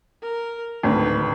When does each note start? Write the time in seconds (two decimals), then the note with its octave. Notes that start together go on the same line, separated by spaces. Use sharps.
0.22 A#4
0.83 D1 G#1 D2 B4